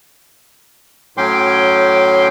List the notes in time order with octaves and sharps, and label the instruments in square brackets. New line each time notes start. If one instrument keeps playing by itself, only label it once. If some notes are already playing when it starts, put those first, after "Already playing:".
[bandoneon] A2 F#3 C#4 G5 C6 D6